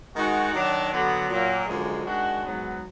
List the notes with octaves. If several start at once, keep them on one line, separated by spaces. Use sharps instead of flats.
D#3 G#3 D#4 F#4
D#3 F#3 D4
D3 F#3 B3
A#2 F#3 A#3
F#2 D3 F3 G#3
D#3 G#3 D4 F#4
G#2 F#3 B3